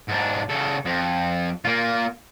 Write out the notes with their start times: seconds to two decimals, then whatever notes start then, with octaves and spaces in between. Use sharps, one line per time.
0.08 G#2 D4
0.50 C#3 A4
0.85 F2
1.65 A#3 F4